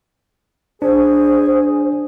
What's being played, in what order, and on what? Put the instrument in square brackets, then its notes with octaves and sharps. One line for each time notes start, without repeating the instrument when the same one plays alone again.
[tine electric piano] D4 [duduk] G#4 [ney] C5